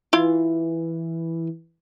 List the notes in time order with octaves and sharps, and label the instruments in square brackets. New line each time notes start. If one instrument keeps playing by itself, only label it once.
[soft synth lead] E3 [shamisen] E4 F4